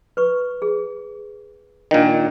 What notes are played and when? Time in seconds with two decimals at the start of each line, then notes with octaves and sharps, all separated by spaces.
0.17 B4 C#6
0.62 G#4
1.91 A#2 D#3 D4 D#5